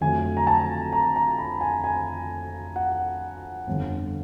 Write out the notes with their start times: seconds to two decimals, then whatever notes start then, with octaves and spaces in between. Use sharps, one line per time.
0.01 F2 D3 F#3 A3 G#5
0.37 A#5
0.47 A5
0.93 A#5
1.16 A#5
1.38 B5
1.61 G#5
1.84 G#5
2.76 F#5
3.67 G1 F2 D3